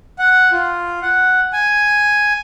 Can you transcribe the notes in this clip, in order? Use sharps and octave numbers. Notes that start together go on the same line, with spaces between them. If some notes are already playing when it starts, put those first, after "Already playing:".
F#5
F4
F#5
G#5